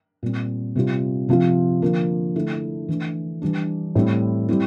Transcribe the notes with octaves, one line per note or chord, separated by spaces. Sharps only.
A#2 G3 C4
C3 G3 C4 F4
C3 F3 C4 F4
D3 F3 A#3
D3 A3 E4
E3 A3 D4
E3 G3 D4
A2 G3 C4 E4
G3 C4 E4